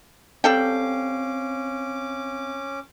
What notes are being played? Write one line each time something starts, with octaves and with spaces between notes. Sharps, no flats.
G3 C4 C#4 A4 F5 G5 D6 C7